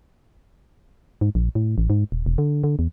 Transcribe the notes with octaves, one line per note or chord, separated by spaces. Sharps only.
G#2
A#1
A2
A1
G#2
D#1
E1
D3
D3
E2